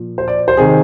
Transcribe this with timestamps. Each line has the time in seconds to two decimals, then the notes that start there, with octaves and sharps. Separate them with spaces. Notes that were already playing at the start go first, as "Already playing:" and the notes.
Already playing: A#2 F3
0.18 C5
0.28 D5
0.48 C5
0.57 C3 D#3 G#4